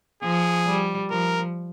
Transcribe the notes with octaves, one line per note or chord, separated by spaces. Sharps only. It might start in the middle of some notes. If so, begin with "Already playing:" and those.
F3 G#4
G3
F3 A#4